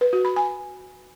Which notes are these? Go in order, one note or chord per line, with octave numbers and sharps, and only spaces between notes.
B4
F#4
B5
G#5